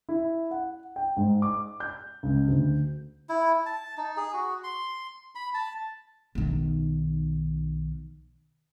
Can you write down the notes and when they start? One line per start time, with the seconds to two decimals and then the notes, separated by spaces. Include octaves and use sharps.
0.09 E4
0.51 F#5
0.96 G5
1.17 G#2
1.42 D6
1.80 G6
2.23 C#2
2.48 D2
3.29 E4
3.66 A5
3.97 D#4
4.17 G#4
4.34 F#4
4.64 C6
5.35 B5
5.54 A5
6.35 B1 D#3